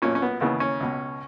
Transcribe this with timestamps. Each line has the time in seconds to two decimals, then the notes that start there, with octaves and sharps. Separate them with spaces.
0.02 B1 A#2 C#4
0.15 C#4
0.22 B3
0.41 D#2 C#3 E3 B3
0.60 C#4
0.81 C#2 B2